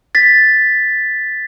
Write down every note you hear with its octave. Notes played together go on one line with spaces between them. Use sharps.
A6 B6